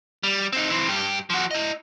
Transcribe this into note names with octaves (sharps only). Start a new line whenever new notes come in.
G3
C4 D#4
E3 C4
G2 G4
F3 F#4
E4 D#5